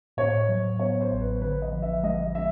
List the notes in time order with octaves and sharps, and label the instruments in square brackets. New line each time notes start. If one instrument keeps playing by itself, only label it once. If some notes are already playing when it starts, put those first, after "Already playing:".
[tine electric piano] A2 [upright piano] C#5
[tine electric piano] F#3
[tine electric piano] B3 [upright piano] C#5
[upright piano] C5
[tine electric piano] A1
[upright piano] B4
[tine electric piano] D3 [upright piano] B4
[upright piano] D#5
[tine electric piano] F3
[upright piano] E5
[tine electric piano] G#3 [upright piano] D#5
[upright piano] E5